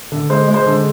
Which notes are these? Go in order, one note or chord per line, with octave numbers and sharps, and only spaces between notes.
D3
G#3 C5
G#3
C5
D3